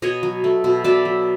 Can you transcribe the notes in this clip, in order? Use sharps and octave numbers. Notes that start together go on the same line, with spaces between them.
B2 C#5 D#5
F#3
A3
B2
B2 D5 E5
F#3